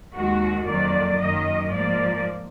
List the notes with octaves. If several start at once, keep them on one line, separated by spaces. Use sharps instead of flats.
D#2 D#3 G#3 F#4
F2 D#3 F#3 A#3 D5
F#2 D#3 A#3 D#5
G#2 F3 A#3 D5